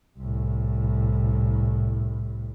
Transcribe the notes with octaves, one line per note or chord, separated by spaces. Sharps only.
C2 A2